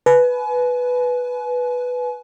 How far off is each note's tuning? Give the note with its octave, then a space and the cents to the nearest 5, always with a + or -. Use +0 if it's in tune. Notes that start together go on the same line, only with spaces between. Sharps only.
B4 +0 G#5 +40